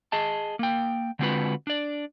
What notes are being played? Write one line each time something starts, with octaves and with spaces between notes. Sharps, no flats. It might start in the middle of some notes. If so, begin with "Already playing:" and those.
G#4 D#5 A5
A#3 G5
D3 G#3 C4 F4 F#4 B4
D4 D5